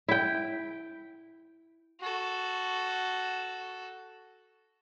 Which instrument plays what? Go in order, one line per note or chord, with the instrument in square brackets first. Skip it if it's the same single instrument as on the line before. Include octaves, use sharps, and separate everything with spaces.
[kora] E4 G5
[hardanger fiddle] F#4 A4